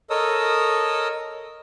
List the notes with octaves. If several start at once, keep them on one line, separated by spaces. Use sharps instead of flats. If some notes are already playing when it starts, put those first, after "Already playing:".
A4 A#4 C#5 D#5 D#6 E6